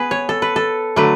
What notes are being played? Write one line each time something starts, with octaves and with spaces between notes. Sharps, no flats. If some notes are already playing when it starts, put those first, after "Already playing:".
Already playing: B3 G#4 B4
C#5
A4
B4
A4
D3 F#3 A3 B4